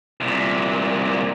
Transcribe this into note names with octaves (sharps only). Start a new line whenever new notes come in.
C2 A#2